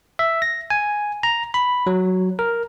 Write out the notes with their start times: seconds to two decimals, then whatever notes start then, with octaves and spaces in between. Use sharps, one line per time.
0.19 E5
0.42 A#6
0.70 G#5
1.23 A#5
1.54 B5
1.87 F#3
2.39 A#4